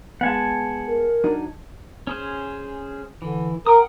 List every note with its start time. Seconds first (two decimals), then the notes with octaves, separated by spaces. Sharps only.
0.21 G#3 B3 F#5 G#5 A5
0.87 A#4
1.24 F#3 D4 D#4
2.07 C#4 G#4 C5
3.22 D3 E3
3.66 A#4 F#5 G5 D#6